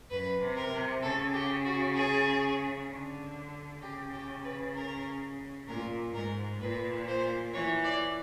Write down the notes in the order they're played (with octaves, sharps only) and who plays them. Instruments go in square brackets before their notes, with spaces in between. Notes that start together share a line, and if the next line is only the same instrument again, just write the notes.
[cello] F#2 [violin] B4
[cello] C3
[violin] A#4
[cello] C3
[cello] C#3 [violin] A4
[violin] G4
F#4
G#4
[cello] D3
[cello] C#3 [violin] G4
[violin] G4
B4
A#4
[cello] A#2 [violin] A#4
[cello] G#2 [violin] A#4
[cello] A#2 [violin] B4
[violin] C5
[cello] E3 [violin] C#5
[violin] D5